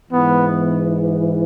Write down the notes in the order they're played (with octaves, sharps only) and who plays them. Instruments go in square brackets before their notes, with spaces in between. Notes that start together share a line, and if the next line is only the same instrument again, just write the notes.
[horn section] G#2 E3 B3